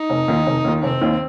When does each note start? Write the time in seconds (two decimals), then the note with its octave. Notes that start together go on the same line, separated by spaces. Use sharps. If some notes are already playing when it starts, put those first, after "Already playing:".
Already playing: D#4
0.10 F1
0.28 D#2 D#3
0.46 F1
0.65 D#2 D#3
0.83 F1 C4
1.01 D#2 D#3